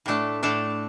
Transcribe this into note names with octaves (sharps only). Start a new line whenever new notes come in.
A2 A3 D4 A4
A2 A3 D4 A4